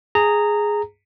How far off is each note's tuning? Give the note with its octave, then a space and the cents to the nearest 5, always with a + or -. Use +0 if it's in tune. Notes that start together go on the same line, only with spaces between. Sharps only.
G#4 +0 A#5 -15